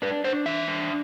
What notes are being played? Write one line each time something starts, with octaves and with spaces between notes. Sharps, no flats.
D4 B4
D4 C5
E3 E5
D4